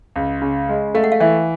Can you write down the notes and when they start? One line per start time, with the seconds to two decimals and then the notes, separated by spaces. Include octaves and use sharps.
0.16 C#2
0.42 C#3
0.69 G#3
0.94 A3 F5
1.04 F#5
1.12 F5
1.20 E3 E5